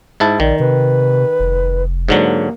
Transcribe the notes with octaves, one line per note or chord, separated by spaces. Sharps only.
G#2 E4 A5
A#1 D#3 D5
C3 B4
F1
G#2 D3 F#3 A#3